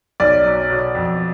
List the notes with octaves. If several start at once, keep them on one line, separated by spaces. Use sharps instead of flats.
B1 D5
F#3
B2
F2